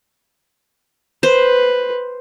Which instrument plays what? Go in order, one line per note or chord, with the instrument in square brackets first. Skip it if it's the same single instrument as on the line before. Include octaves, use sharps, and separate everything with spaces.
[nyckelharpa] B4 [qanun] C5